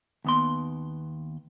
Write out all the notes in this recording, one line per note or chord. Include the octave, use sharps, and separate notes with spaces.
D#2 B3 C6